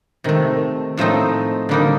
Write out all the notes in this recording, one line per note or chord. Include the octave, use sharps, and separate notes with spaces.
C3 D#3 A3
A2 F3 A3 C4 D#4
D3 G3 A#3 D#4